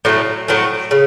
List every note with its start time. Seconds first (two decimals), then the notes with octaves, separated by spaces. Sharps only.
0.05 A2 F#3 A3
0.48 A2 F#3 A3
0.91 C#3